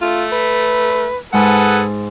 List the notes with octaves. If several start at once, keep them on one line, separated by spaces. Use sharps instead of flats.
A3 F4
B4
G#2 G#3 G#4 A4 B4 F#5